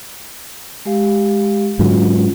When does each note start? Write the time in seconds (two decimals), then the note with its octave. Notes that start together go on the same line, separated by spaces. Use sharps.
0.85 G#3 G4 F5
1.79 G#2 D3 F#3 C#4 F4